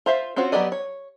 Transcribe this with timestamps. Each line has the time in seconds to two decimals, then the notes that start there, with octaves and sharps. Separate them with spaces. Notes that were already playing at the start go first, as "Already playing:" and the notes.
0.06 F4 C5 E5 F5
0.36 C4 C#4 F4 F#4 C5
0.52 F#3 B3 G4 D5 D#5
0.72 C#5